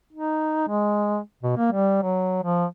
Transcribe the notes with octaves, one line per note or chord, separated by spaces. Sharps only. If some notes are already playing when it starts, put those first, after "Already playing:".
D#4
G#3
B2
A#3
G3
F#3
F3